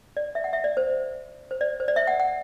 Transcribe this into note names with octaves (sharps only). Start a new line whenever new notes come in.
D5
E5
F#5
E5
D5
C5
C5
D5
C5
D5
E5
F#5
F#5